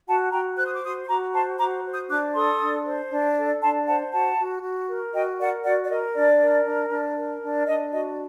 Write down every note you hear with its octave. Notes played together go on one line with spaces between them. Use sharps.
F#4 F#5 A5
F#4 G5 A#5
C5 F#6
D#6
D6
F#4 C6 D#6
C6
F#4 A#5 D6
C5 A5 C6
F#4 A#5 D6
C5
D#6 G6
D4 D6 F#6
A4 C6 D#6
D4
C5
D4
A4
D4 A5 C6
C5 F#5 A5
F#4 F#5 A5
F#4
F#4
A#4
F#4 D#5 G5
A#4 D5 F#5
F#4 D5 F#5
D5
A#4 D#5
D4 D5
A#4
D4
D4
A#4
D4
D4 D#5
F#4 D#5